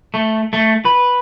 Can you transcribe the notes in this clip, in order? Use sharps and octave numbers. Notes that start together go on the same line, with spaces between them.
A3
A3
B4